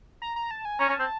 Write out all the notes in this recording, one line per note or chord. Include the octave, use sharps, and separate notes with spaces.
A#5
A#5
A5
G#5
C#4 A#5
C#4
A5
C4